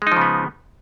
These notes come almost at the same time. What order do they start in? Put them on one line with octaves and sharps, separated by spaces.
G#3 D#4 F3 C#3 B3